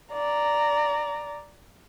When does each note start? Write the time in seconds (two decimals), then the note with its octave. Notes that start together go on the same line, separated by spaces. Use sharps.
0.13 D5 A#5